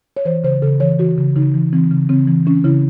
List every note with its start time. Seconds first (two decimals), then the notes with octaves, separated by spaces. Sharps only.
0.17 C#5
0.25 E3 C5
0.44 C#3 C5
0.62 C#3 A4
0.80 E3 C#5
0.99 E3 F#4
1.18 C#3
1.36 C#3 D#4
1.54 E3
1.73 E3 C4
1.91 C#3
2.09 C#3 C4
2.28 E3
2.46 E3 C#4
2.64 C#3 E4